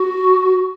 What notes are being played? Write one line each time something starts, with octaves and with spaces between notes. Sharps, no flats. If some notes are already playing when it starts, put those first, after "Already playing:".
Already playing: F#4